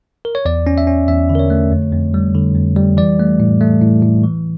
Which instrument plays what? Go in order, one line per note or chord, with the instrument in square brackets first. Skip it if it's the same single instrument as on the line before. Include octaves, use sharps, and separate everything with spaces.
[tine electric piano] A#4
C#5
E2 D5
C#4
E5
C#4
E2 E5
D3
A#4
C#5
A3
F2
F2
G3
D3
F2
G3
E3 D5
A3
A2
A3
A2
A2
E3